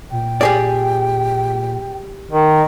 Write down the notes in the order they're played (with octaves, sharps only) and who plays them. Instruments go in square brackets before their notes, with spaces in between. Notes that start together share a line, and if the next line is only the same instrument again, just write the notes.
[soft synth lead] A#2 [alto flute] G5
[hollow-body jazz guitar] G4 G#4 D5
[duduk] D#3 [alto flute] D#5